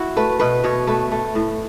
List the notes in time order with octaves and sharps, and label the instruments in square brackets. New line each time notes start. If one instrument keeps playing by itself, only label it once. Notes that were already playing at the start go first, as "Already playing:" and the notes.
Already playing: [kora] E4 F#4
A3 B4
B2 B4
B2 C#5
A3 B4
A3
A2